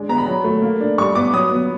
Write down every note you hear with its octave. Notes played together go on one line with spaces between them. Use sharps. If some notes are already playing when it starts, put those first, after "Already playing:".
Already playing: G#3 D4
B3 A#5
B5
F#3
A3
A#3
D4
G3 C#6
B3 D6
F#3 D#6
B3